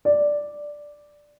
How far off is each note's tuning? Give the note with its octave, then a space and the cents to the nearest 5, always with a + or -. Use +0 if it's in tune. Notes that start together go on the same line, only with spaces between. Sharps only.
D5 +0